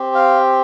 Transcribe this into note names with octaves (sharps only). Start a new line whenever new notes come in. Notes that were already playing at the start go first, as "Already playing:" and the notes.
Already playing: C4 G4
F5